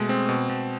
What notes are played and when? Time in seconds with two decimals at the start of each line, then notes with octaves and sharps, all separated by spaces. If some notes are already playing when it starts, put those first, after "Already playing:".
Already playing: B2 G#3 A3
0.09 C4
0.29 B2
0.49 B2